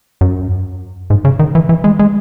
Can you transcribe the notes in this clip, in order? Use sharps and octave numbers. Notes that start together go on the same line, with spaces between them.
F#2
G#2
C#3
D#3
E3
E3
G#3
G#3